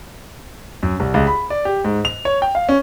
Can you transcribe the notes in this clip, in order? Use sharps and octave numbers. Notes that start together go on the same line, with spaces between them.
F#2
C2
C#2
B5
D5
G4
G#2
F7
C#5
G5
F5
C#4